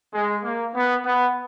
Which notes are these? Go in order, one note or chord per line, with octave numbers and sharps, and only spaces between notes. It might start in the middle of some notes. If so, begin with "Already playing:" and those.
G#3
A#3
B3
B3